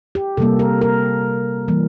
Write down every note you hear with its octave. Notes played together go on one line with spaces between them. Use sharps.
G4
C3 G3 A#3 A4
A#4
A#4
E3 G3 A#3